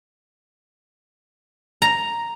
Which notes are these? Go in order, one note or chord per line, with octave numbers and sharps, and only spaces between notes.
A#5